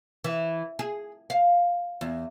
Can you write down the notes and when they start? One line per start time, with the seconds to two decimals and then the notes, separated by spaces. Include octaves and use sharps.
0.24 E3
0.79 G#4
1.30 F5
2.01 E2